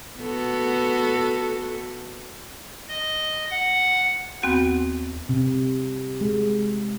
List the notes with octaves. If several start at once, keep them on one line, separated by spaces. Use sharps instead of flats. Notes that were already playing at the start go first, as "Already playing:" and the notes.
B3 F#4 A4
D#5
F#5
D#2 B3 C4 F#4 F#5 G6
C3
G#3